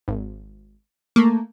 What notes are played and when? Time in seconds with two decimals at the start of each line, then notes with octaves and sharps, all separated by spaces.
0.08 G#1
1.16 A3 A#3